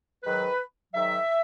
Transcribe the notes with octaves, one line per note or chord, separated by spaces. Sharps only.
G#2 D#3 F#3 B4
G#2 D#3 F#3 E5